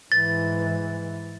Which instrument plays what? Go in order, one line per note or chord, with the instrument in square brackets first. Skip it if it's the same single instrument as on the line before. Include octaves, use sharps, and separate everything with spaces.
[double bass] G#2 E3 [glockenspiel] A6